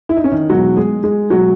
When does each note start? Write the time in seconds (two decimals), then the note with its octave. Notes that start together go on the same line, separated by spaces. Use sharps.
0.09 E4
0.17 D#4
0.24 C#4
0.32 D#3 D#4
0.49 E1 E2 B2 F#3 G#3 F#4
0.76 G#3 G#4
1.04 G#3 G#4
1.30 B2 F#3 G#3 F#4